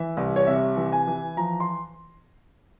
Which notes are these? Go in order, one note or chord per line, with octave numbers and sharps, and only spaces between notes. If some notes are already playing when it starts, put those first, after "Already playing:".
Already playing: E3 E5
C2
C#5
C3 E5
E3
G#5
E3
F3 A#5
C6